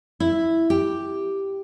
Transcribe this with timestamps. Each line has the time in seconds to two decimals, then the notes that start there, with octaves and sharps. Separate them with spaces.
0.20 E4
0.70 G4